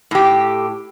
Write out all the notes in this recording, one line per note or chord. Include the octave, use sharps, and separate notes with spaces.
A2 G4